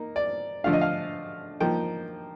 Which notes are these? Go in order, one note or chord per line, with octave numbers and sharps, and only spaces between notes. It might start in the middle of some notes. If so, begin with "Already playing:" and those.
Already playing: A#3 D#4
D5
D3 F3 A3 D4 F5
D#5
F5
F3 A#3 D#4 G5